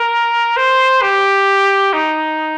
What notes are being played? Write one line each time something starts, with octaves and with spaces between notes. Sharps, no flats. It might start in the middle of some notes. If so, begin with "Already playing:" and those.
Already playing: A#4
C5
G4
D#4